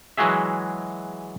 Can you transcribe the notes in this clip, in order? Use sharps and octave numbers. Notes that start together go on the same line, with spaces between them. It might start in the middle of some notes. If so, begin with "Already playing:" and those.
E3 F#3 G#3 F#4 G#4 E5